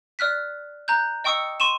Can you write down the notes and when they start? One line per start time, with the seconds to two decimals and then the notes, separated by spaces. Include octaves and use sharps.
0.19 D5 F6 F#6 B6
0.88 A#5 F#6 G6
1.24 D#5 G5 C#6 D#6 E6 C#7
1.60 C6 C#6 D#7 E7